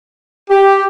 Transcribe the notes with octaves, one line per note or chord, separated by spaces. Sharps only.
G4